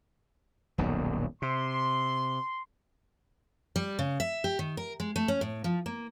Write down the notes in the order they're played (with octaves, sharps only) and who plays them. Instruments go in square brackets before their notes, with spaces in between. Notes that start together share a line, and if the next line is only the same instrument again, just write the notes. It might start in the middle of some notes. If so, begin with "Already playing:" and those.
[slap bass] D#1 B1 F#2
[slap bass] C3 [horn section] C6
[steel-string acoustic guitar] G3
C#3
E5
G4
D#3
A#4
G#3
A3
C#4
A2
F3
A#3